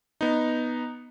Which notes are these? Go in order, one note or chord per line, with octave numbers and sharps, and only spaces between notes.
B3 D#4